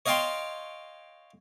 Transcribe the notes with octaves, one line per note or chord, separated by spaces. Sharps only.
C#5 D#5 F5 G5 A5 C6